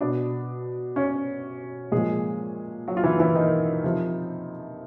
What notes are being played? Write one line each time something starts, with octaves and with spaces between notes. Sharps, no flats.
B2 D4 D5
C#4 C#5
A#2 F3 G#3 G#4
F#3 F#4
F4
E3 E4
E3 E4
D#3 D#4
C3 F3